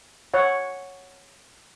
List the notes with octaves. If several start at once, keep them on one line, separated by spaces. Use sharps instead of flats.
C#5 F#5